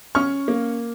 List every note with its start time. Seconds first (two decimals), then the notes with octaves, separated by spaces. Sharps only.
0.15 C#4 C#6 F6
0.48 A#3